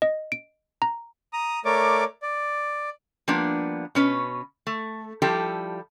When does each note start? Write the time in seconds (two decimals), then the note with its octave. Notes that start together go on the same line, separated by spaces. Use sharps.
0.02 D#5
0.32 D7
0.82 A#5
1.33 A#5 D#6
1.65 A3 A#4 C#5 D5 D6
2.22 D5
3.28 F3 G3 A#3 B3 D4
3.95 B2 C#4 B4
4.67 A3
5.22 F3 G3 E4 G4 A4